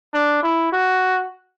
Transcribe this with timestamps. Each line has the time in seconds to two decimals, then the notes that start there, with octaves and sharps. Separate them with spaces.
0.14 D4
0.43 E4
0.72 F#4